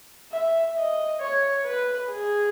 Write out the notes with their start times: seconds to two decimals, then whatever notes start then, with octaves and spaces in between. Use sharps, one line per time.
0.32 E5
0.77 D#5
1.21 C#5
1.65 B4
2.10 G#4